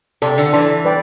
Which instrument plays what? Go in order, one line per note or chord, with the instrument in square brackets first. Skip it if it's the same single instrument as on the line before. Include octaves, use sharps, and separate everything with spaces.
[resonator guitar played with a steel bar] C3 [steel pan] A4 D5 A5 C6
[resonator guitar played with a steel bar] D3
[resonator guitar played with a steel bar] E3 [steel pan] A4 D5 A5 C6
[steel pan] B4 D5 G5